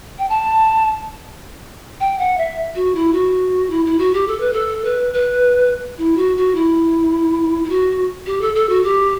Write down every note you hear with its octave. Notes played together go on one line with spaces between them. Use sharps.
G5
A5
G5
F#5
E5
F#4
E4
F#4
E4
E4
F#4
G4
A4
B4
A4
B4
B4
E4
F#4
F#4
E4
E4
F#4
G4
A4
A4
F#4
G4